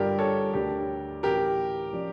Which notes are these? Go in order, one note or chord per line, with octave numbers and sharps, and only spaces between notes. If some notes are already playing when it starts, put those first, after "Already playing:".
Already playing: G2 D3 G3 D4 F4 G4 A#4
A4 C#5
D2 D3 G3 D4 G4 A#4
A2 E3 A3 C#4 G4 A#4
F3 C#4 G4 D5